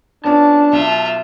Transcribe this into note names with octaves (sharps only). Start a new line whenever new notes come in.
B3 C#4 D4 F4 A5
B1 F4 E5 E7